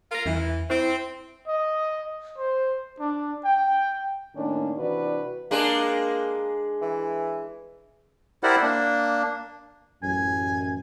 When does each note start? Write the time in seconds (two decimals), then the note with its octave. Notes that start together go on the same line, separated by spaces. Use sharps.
0.11 F4 A#4
0.26 E2 E3
0.70 C4 E4
1.48 D#5
2.38 C5
3.00 D4
3.45 G5
4.35 A2 D#3 A#3 C#4 D4
4.78 C3 E3 D4 F#4 B4 D5
5.51 G#3 A#3 D4 G#4
6.82 E3
8.43 E4 G4 A#4 C5 D5 F#5
8.63 A#3 D4
10.03 A1 F#2 G#5